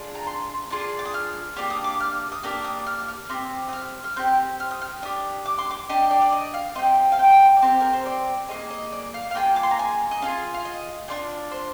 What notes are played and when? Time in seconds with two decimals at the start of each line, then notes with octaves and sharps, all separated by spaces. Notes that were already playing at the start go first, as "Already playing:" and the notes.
Already playing: D4 F4 G#4
0.15 A#5
0.27 C6
0.70 D4 F4 G#4 D6
0.99 D6
1.05 D#6
1.14 F6
1.56 A#3 D4 G4 D6
1.70 D#6
1.84 D6
2.00 F6
2.32 D#6
2.43 A#3 D4 G4 F6
2.64 D#6
2.87 F6
3.09 F6
3.29 C4 G4 F6
3.69 D#6
3.73 F6
4.04 F6
4.16 C4 G4 G6
4.60 F6
4.71 D#6
4.82 F6
5.02 D4 G4 D#6
5.45 D6
5.59 C6
5.71 D6
5.89 D4 G4 D#5
6.11 D5
6.22 D5
6.32 D#5
6.54 F5
6.75 C4 G4 D#5
7.12 F5
7.19 G5
7.57 D5
7.62 C4 G4 C5
7.80 A#4
7.93 C5
8.06 D5
8.49 A#3 F4 G#4 D#5
8.71 D#5
8.92 D5
9.14 F5
9.31 F5
9.35 A#3 F4 G#4 G5
9.56 D6
9.63 C6
9.71 A#5
9.79 G#5
10.11 D#5
10.22 D4 F4 G#4 F5
10.54 F5
10.65 D#5
11.08 D4 F4 G#4 D5
11.52 C5